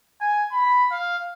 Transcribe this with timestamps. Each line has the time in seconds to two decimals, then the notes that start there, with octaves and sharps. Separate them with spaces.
0.21 G#5
0.52 B5
0.91 F5